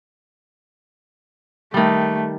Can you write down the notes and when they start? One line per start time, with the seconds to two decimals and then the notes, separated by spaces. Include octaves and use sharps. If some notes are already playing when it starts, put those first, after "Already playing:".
1.74 D#3 G3 A3